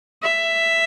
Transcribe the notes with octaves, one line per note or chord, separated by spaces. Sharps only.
E5